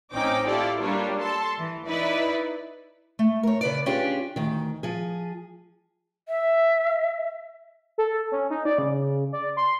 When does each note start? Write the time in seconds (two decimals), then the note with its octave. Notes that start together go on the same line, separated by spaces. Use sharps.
0.13 A1 C4 C#4 D#4 G5 D6
0.47 E4 F4 G4 A4 D5
0.81 G3 A#3 D4 F4 C#5
1.20 A4 A5 C6
1.59 E3
1.88 D#4 E4 B4 D5
3.19 A3
3.43 A#4 C#5
3.61 C#3 B4 D5
3.86 C#4 D4 F4 G4 G#4 D5
4.36 D2 D#3
4.83 F3 G#4
6.28 E5
7.98 A4
8.32 C#4
8.50 D#4
8.65 D5
8.78 C#3
9.33 D5
9.57 C6